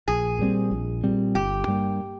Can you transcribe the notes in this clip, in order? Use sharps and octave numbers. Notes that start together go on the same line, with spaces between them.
A#1 G#4
A#2 G3 C4
A#1
A#2 G3 C4
G1 G4
G2 G3 A#3